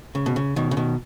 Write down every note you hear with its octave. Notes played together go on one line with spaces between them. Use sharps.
C#3
B2
C#3
B2 D#3
C#3
B2 D#3